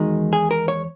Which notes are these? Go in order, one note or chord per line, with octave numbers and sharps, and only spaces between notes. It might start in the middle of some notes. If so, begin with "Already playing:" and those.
Already playing: E2 D#3 G#3 D#4 F#4
G#4
A#4
C#5